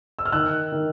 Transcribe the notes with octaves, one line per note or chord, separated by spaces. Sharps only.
E6
F6
D#3 E6 F#6
D#3